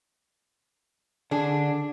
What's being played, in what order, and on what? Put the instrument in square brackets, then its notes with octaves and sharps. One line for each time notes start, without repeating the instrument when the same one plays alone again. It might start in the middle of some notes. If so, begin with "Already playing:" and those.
[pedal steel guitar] D3 [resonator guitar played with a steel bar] D4 G#4